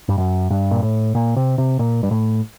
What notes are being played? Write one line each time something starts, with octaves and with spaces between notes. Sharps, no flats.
G2
F#2
G2
A#2
A2
A#2
C3
C3
A#2
G2
A2